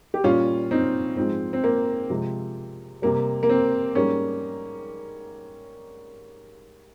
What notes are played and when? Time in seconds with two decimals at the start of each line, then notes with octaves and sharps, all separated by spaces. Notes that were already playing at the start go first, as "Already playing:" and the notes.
0.14 G4
0.24 A#2 G3 C#4 F4
0.71 C4 D#4
1.17 G#2 F3 G#3 C4
1.53 C4
1.64 A#3
2.10 C3 F3 G#3
3.02 C3 G3 A#3
3.43 A#3
3.49 C4
3.95 G#2 G3 A#3 C#4